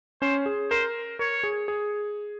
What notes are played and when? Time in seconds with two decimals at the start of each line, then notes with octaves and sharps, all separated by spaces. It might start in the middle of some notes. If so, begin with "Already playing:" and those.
0.22 C#4 C5 C#5
0.46 G#4
0.70 A#4 C5
1.19 A#4 C#5
1.43 G#4
1.68 G#4